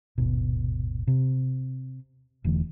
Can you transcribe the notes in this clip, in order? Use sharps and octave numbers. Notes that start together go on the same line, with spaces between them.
D#1 G#1 B2
C3
E1 D3 E3 A3